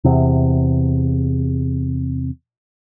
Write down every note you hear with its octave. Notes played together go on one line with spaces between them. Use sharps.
E2 C3